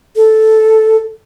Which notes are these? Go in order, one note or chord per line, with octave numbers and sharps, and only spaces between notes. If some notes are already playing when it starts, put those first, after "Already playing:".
A4